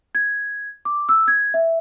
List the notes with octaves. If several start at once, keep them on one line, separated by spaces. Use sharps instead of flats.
G#6
D6
E6
G#6
E5